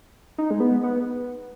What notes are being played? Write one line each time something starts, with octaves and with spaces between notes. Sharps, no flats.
D#4
G#3
B3
B3